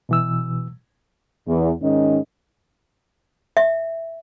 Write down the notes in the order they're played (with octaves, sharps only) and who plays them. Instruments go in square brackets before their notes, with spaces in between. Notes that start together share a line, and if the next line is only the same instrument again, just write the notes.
[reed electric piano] B2 E3 E6
[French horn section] E2
G#2 D#3 C#4 D#5
[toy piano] E5